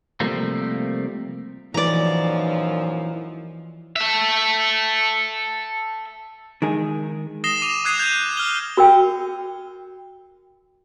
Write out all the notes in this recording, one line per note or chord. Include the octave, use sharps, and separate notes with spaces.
C3 F3 G3 A3 A#3 C4
F#2 A#2 E3 F3 D#4 D5 A#5
A4 E5
D#3 G#3 G#4
D#6 A#6 C7 E7 G7
D6 D#7 F7
D#6 F#6 G#6 C7 D#7
G6 G#6 E7
F6 G7
F#4 A#4 G5